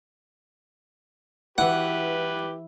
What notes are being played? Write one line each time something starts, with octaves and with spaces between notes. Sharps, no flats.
E3 E4 F#4 G4 B4 F#5